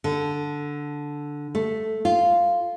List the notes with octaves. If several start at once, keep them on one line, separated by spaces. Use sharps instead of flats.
D3
A3
F4